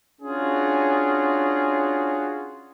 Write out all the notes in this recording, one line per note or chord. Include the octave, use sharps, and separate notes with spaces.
C#4 D4 F4 F#4 G#4